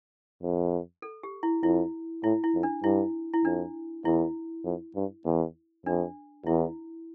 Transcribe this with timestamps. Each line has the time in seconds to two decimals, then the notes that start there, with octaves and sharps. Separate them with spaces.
0.42 F2
1.02 A4
1.23 G4
1.43 E4
1.63 F2 E4
2.24 A2 E4
2.44 E4
2.54 F2
2.63 D4
2.84 G2 E4
3.33 E4
3.44 F2 D4
4.05 E2 E4
4.65 F2
4.95 G2
5.26 E2
5.86 F2 D4
6.46 E2 E4